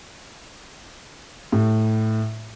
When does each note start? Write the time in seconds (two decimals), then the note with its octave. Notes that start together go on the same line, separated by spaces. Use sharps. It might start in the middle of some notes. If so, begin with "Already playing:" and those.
1.52 A2